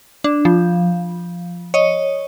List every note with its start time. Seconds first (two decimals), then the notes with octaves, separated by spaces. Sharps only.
0.24 D4
0.45 F3
1.74 C#5 D#5